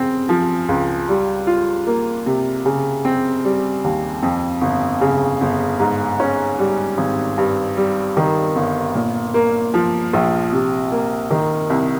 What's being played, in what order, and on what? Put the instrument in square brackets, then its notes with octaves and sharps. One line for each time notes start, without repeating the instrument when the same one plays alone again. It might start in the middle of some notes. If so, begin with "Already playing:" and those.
Already playing: [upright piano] C#3 C4
F3
C#2
G3
F4
A#3
C3
C#3
C4
G3
D#2
F2
G1
C#3
G1
G#2
C#4
G3
G#1
G2
G3
D#3
G1
A#2
A#3
F3
A#1
C3
A#3
D#3
C2